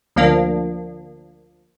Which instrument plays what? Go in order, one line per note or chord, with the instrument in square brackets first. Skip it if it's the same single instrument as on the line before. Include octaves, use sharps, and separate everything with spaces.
[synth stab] D2 F3 A#3 D4